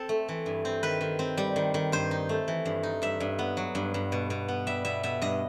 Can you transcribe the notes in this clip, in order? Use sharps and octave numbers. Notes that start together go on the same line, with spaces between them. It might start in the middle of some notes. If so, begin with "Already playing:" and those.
Already playing: C4 A4
A3
E3
G2
C4
D#3 B4
D#3
C4
G3
D#3
D#3
G2 C5
D#4
A3
E3
G2
D#4
G2 E5
G2
B3
F#3
G2
G2
B2
B2
B3
G3 E5
B2 E5
B2 E5
G2 D#5